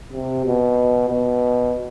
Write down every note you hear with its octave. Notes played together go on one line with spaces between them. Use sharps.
C3
B2
B2